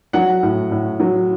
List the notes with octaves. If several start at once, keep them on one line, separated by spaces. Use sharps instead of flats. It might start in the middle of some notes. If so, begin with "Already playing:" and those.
F#3 F#5
A2
A2
F#3